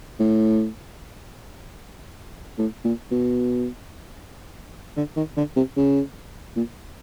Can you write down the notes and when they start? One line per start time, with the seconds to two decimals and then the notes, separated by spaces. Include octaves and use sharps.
0.20 A2
2.58 A2
2.85 A#2
3.11 B2
4.97 D3
5.16 D#3
5.37 D3
5.56 C3
5.77 C#3
6.56 A#2